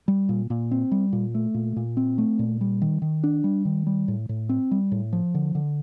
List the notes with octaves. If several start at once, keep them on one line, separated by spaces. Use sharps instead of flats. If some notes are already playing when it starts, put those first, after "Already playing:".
G3
A#2
A#2
C4
G3
A#2
A3
A#2
A#2
C4
A3
A#2
G3
D#3
D#3
D4
G3
D#3
G3
A2
A2
C4
G3
A2
F3
D3
D3